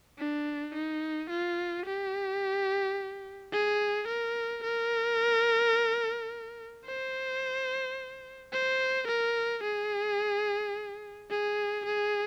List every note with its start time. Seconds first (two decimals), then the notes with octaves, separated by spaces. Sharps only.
0.19 D4
0.75 D#4
1.30 F4
1.86 G4
3.52 G#4
4.08 A#4
4.63 A#4
6.86 C5
8.53 C5
9.08 A#4
9.63 G#4
11.30 G#4
11.86 G#4